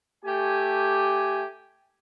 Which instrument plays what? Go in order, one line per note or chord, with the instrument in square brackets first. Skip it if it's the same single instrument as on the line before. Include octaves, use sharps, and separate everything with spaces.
[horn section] A3 G4 G#5